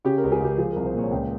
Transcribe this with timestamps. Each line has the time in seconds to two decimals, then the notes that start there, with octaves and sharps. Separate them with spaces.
0.05 C#3 G4
0.18 A#4
0.23 C#2
0.32 G#4
0.40 C#2 G4
0.58 F3 G#4
0.72 C2 A#4
0.85 C5
0.94 A#2 C#5
1.11 C#2 G5